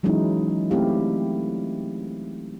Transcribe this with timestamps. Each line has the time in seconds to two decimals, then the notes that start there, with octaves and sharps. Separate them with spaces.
0.03 E3 F#3 G#3 C#4 D#4 E4
0.70 A3 C4 E4 G4 F5